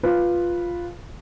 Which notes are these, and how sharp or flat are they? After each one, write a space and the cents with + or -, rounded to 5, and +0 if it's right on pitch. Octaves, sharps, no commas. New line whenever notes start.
F4 +0 B4 -5